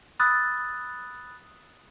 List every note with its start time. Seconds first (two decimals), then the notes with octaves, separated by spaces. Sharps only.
0.19 B5 D#6 E6 F#6 A6